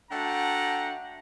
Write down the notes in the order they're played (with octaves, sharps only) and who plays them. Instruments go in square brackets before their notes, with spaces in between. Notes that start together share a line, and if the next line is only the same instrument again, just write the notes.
[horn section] A3 D4 F#4 F#5 G5 A#5